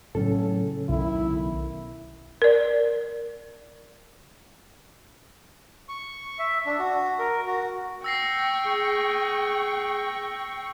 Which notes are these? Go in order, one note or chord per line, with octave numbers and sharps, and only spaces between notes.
A2 C#3 F#3 C#4 A4
B1 D#3 E4
A#4 D5
C#6
E5
D4
F#4
A#4
F#4
G5 C#6 E6 A#6 C7
G#4